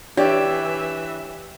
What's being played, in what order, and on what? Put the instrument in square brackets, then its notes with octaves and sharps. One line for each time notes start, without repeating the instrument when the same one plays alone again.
[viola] E3 E5 [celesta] D4 [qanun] G4 [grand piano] C#5 D5 G5